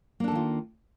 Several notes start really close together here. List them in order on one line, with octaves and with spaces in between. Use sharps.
A#3 D4 A4 D#3 F4